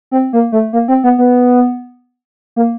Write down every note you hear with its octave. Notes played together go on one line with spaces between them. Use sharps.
C4
A#3
A3
A#3
C4
B3
B3
A#3